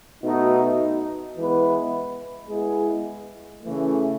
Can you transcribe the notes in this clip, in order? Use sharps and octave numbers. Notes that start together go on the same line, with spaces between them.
B2 A3 D#4 F#4
E3 G#3 B3 E4 B4
G#3 B3 E4 G#4
C#3 E3 A3